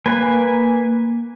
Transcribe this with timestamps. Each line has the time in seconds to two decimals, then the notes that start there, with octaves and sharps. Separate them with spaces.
0.06 A#3 B4 G#5